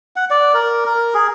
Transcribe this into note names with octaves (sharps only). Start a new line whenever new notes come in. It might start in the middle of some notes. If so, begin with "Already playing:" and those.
F#5
D5
A#4
A#4
G#4